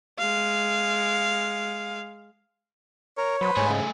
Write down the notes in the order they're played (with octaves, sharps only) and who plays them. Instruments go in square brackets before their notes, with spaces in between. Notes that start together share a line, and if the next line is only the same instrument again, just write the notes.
[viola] G#3 F5
[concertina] A#4 [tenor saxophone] C#5
[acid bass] F#3 [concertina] B4 C5
[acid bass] G#2 [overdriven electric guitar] A3 G#4 [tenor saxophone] C#5
[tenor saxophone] C#3